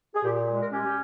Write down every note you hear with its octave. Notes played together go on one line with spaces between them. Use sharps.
G#4
A#2 G4
G4
G#3
A#4
C#4 G4
G4